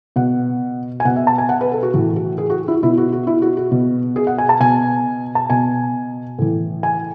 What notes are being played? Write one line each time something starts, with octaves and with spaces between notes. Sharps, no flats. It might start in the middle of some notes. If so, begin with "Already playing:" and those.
B2 F#5
G#5
B2 F#5
E5
A5
G#5
F#5
B4
A4
F#4
A2 E3 F#4
F#4
G#4
F#4
E4
F#4
B2 E4
F#4
F#4
E4
F#4
F#4
B2
G#4
F#5
G#5
A5
B2 G#5
A5
B2 G#5
A2 E3
G#5